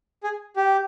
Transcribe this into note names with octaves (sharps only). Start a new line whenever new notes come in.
G#4
G4